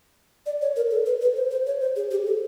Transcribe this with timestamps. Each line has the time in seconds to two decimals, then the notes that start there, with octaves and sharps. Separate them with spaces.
0.46 D5
0.61 C#5
0.76 A#4
0.91 A4
1.06 B4
1.21 B4
1.36 C5
1.51 C5
1.67 C#5
1.81 C5
1.96 G#4
2.11 G4
2.27 A4